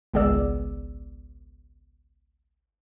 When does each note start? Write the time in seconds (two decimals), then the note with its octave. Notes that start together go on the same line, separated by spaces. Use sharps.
0.13 G#1 C#2 B3 G#4 D5 E6